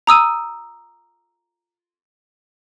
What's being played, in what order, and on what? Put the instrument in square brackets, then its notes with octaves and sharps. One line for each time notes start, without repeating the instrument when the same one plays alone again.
[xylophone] A#5 D#6 E6 D#7